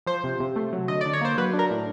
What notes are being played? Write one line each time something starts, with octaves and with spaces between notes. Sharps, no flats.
F3 C5
C3
C3
A3
F#3
D3 D#5
D3 D5
C#5
A#3 C5
F#3 B4
D4
A#4
A2